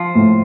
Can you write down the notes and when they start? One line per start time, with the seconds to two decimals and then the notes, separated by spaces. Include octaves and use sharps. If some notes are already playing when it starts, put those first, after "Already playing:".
Already playing: F3
0.15 A2